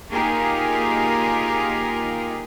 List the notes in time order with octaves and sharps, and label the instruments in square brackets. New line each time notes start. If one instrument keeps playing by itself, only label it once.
[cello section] A#3 D#4 F4 G4 G#4 A#4